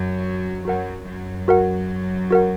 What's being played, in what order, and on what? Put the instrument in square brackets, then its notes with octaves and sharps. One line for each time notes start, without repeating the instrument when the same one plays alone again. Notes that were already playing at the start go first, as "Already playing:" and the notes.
Already playing: [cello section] F#2 F#3
[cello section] F#2 F#3 [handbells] F#4 A#4 F#5
[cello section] F#2 F#3
[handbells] F#4 A#4 F#5
F#4 A#4 F#5